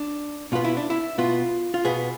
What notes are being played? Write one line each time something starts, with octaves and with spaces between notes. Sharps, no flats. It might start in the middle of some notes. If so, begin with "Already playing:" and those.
Already playing: D4
B2 B3 F4
E4
D4
E4
B2 B3 F4
F4
B2 B3 G#4